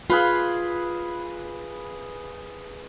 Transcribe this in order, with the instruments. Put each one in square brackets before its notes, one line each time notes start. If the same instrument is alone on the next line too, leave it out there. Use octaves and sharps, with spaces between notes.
[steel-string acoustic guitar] F4 F5 [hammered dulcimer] G#4 B4 B5